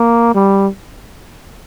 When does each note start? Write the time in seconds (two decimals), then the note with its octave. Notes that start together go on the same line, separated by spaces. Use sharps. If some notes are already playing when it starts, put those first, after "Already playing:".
Already playing: A#3
0.35 G3